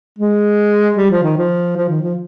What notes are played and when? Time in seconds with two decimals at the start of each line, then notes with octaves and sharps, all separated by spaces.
0.19 G#3
0.97 G3
1.11 F3
1.23 D#3
1.37 F3
1.77 F3
1.89 D#3
2.02 F3